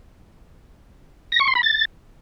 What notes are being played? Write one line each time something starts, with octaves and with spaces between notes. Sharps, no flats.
A#6
C#6
C6
B5
A6